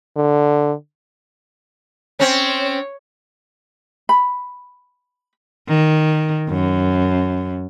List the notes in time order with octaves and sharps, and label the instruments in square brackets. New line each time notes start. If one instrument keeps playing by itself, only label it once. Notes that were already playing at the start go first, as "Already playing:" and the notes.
[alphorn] D3
[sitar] C4 C#4 [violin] C#5
[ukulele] B5
[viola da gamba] D#3
F#2